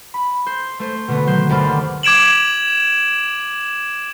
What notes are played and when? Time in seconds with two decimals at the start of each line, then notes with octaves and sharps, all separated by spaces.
0.14 B5
0.46 C5
0.80 A3 C5
1.08 B2 D3 A3 B3
1.27 D#3 F#3 C5
1.49 G1 D#2 C5 D5 B5 F6
2.03 D6 G#6 D7 E7 F#7